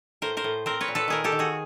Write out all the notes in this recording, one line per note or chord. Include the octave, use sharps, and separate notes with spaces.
A2 A#4 C5
A#4 C5
A2
C4 A#4 C5
B4 C#5
A#2
A4 B4
D#3 G#4 A#4
G4 A4
D#3
F#4 G#4